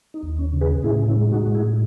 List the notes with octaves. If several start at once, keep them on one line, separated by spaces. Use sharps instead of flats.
D#4
D#2
C#4
C#3
G#4 B4
A2 E4 G#4
C#4 E4
G#3
D#4 F#4
A2
E4 G#4